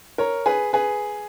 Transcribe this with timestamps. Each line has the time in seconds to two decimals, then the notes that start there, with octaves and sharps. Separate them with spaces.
0.18 A#4 C#5
0.46 G#4 B4
0.73 G#4 B4